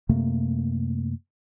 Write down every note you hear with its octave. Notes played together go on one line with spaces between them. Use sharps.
F#2 C3 A3 A#3